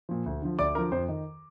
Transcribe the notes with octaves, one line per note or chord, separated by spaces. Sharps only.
A#2 F3
D2
D3 F3
D2 D5 D6
D3 F3 A#4 A#5
F2 C5
D#3